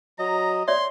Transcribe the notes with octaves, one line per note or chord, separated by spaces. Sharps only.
F#3 D#5 A#5
C#5 D5 E5 C6